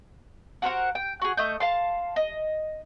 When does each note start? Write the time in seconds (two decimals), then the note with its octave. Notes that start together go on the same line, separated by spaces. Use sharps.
0.62 F#4 A#4 C5 F#5
0.95 G5
1.22 F#4 G#4
1.37 A3 D#5 G6
1.60 F5 A5 C6
2.16 D#5